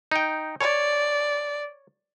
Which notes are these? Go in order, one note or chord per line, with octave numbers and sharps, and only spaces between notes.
D#4 G5
C#5 D5